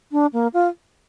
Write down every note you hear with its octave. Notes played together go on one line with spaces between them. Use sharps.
D4
A#3
F4